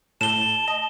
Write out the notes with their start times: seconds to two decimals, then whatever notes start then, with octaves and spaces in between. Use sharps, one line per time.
0.21 A2 A5 E7 G7
0.68 D#5